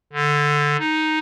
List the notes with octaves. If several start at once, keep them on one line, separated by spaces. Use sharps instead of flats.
D3
D#4